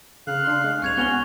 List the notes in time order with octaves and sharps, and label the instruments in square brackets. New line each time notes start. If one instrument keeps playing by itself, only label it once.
[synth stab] C#3 [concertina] F5 F#6
[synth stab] D4 C6
G#3
[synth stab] C2 G#2 [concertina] C#6 [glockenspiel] F#6 G#6 F7
[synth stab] B3 [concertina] C#4 F#4 [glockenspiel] C#6 F7 G7